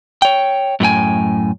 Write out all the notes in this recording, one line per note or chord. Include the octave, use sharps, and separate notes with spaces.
C#5 G5
F#2 A2 C4 G5 G#5